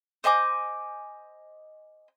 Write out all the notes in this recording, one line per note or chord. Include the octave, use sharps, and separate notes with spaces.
C5 D#5 G#5 D6